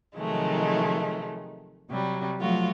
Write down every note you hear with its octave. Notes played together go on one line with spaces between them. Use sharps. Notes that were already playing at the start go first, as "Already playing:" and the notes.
C3 D#3 F3 F#3 G#3 A3
C3 F#3 G3
F3 F#3 A3 F4 F#4